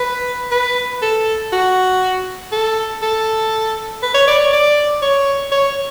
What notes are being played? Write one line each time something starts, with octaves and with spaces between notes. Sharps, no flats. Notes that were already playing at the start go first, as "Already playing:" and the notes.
Already playing: B4
B4
A4
F#4
A4
A4
B4
C#5
D5
C#5
D5
C#5
C#5